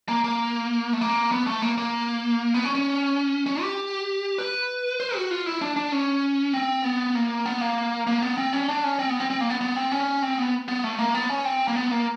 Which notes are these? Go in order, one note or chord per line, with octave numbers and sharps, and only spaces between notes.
A#3
A#3
A3
A#3
B3
A3
A#3
A#3
B3
C#4
C#4
C#4
G4
B4
C5
F#4
F4
E4
D4
D4
C#4
C4
B3
A#3
B3
A#3
A#3
B3
C4
C#4
D4
C#4
C4
B3
C4
C4
A#3
B3
B3
C4
C#4
C4
B3
B3
A3
A#3
B3
C#4
C4
A#3
B3
A#3